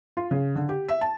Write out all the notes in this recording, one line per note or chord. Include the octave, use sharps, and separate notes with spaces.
F4
C#3
D3
G4
E5
A5